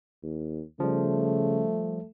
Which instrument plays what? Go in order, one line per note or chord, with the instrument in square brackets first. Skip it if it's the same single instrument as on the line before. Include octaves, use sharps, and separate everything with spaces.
[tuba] D#2
[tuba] C#3 [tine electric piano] F3 G3 [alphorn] A3